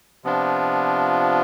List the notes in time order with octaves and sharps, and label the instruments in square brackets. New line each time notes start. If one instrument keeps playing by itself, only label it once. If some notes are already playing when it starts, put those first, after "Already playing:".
[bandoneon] C3 F3 B3 D4 F4